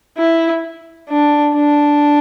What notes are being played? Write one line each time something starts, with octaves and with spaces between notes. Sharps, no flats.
E4
D4
D4